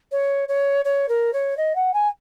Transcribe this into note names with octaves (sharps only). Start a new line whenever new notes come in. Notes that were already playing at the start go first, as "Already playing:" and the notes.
C#5
C#5
C#5
A#4
C#5
D#5
F#5
G#5